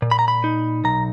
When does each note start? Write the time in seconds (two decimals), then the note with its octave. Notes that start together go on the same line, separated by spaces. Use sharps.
0.02 A#2
0.11 B5
0.19 A#5
0.28 B5
0.44 D#4
0.84 B1 A#5